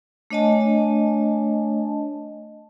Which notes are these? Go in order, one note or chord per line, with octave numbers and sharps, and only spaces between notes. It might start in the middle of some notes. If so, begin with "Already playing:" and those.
A3 D4 C#5 D#5 G#5 A5